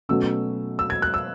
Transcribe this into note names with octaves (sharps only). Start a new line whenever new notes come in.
B2 F#3 A3 C#4 E6
E6
G#6
F#6
E6